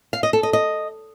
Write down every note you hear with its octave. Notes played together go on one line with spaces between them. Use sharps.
F5
D#5
A4
D#5
D#5